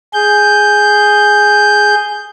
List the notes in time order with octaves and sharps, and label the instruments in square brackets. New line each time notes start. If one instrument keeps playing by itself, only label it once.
[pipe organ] G#4 G6